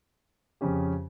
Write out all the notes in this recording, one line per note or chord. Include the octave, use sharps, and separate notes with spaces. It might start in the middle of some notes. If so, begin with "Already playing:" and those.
F2 C#3 F3 C#4 G4